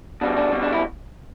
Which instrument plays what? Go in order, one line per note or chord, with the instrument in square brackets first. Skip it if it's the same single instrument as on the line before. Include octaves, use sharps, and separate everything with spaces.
[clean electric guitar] B2 G3 D4
D4
B2 G3
D4
E4